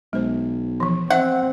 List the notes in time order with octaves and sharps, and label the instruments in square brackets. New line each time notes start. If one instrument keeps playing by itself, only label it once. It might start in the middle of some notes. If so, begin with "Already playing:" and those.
[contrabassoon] B1 [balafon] G#3 C5
[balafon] E3 F3
[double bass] C4 [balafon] C5 E5 [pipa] F#5